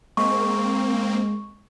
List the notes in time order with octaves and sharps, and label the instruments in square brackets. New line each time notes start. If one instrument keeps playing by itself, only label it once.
[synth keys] G#3 [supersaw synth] A#3 C4 [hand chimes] C#6